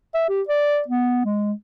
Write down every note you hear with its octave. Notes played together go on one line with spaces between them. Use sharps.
E5
G4
D5
B3
G#3